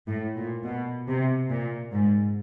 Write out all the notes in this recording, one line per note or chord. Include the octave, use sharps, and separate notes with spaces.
A2
A#2
B2
C3
A#2
G#2